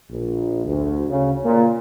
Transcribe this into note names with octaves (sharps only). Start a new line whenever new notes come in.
A#1
D2
C#3
A#2